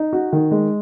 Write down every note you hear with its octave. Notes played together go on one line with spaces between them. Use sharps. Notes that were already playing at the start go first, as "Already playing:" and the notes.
Already playing: D#4
F#4
D#3
G#3